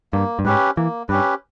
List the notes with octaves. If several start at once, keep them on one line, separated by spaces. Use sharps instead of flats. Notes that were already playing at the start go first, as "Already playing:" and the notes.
G2 A#3
G2
G#2 C#4 G4 B4
E3 A#3
G2 C#4 G4 B4